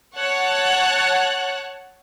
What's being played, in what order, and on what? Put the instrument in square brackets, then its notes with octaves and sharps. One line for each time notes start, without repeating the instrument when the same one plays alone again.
[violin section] C#5 F#5 A5 F#6